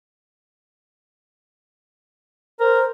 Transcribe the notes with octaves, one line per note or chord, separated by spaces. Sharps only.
A#4 C5